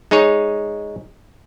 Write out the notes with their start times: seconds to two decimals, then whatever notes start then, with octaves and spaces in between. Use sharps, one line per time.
0.11 G#3 D#4 G#4 C#5